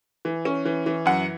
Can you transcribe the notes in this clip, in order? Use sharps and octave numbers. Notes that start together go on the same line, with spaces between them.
E3
C#4
E3
E3
F#2 F#5